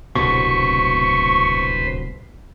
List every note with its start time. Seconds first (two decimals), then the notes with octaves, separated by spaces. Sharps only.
0.15 D1 C2 B2 B4 C5 C#6